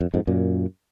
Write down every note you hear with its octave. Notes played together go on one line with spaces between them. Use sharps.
F2
F2 G#2
F#2 A#2